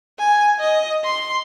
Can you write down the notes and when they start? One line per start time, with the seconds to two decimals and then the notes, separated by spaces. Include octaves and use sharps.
0.19 G#5
0.60 D#5
1.04 C6